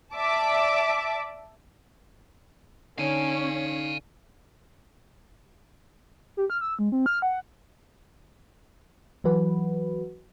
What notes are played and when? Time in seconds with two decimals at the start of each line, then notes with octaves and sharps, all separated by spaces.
0.14 D5 E5 A5 D6
2.98 D3 C#4 D#4 F5 G#5
6.37 G4
6.50 F6
6.61 E6
6.79 G#3
6.92 C4
7.06 F6
7.22 F#5
9.24 E3 F#3 F#4 B4